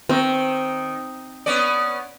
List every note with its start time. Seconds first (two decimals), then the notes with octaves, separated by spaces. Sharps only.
0.09 D#3 C4
1.46 B3 C#4 D5